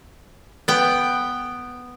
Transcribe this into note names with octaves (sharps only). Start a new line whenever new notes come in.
B3 G5